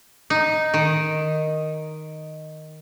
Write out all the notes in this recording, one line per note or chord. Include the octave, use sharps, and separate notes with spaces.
D#4
D#3